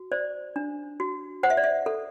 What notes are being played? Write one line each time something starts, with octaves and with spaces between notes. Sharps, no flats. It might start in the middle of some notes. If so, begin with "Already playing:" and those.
Already playing: F#4
C5 D5
D4
F#4
C5 F#5
E5
D5
E5
A4